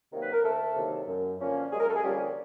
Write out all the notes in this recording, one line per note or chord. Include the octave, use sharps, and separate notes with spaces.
C3 D#3 F#3 A#3
B4
A#4
D2 A3 A4
C3 D#3 F#3 A#3
F#2
D3 F3 A#3 C#4
F#2 G#3 G#4
A#4
A4
G#4
D3 F3 G3 A#3 C#4 G4